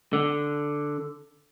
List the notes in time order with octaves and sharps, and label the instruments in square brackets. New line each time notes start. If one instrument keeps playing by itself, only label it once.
[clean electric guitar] D3